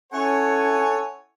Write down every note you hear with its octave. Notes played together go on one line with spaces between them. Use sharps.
C#4 E4 A4 C#5 F#5 G#5